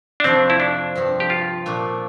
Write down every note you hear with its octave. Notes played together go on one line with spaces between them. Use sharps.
D4
F2 C3 F3 A3 C4
E4
D4
G2 F3 C4
G4
F4
A#2 A3 D4